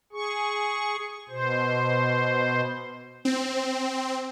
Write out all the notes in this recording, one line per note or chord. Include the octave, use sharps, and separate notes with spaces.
G#4 C#6
B2 C5
C4